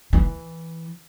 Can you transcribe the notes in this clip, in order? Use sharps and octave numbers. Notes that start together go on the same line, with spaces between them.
E3